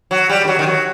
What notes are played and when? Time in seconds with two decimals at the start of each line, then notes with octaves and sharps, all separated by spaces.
0.11 F#3
0.29 G3
0.44 D#3
0.48 F#3
0.59 D#3
0.66 F#3